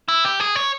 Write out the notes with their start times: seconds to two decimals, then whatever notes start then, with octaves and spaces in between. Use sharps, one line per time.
0.08 E4
0.24 G4
0.40 G#4
0.56 C#5